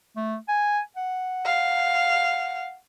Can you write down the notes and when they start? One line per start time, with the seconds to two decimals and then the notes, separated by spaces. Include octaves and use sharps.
0.16 A3
0.48 G#5
0.96 F#5
1.46 F5